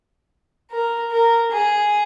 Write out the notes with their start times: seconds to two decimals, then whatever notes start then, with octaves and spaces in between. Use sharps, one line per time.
0.72 A#4
1.12 A#4
1.52 G#4